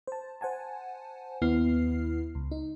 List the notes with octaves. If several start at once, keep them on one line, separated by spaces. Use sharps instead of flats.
C5 A5
C5 F#5 G#5 A5
D#2 B3 E4 F6 C7
C#2
D#4